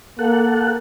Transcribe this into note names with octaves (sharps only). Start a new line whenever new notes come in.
A#3 A4 F#5